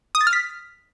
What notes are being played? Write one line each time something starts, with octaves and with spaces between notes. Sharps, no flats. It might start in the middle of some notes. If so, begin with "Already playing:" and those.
D#6
A6
F6
B6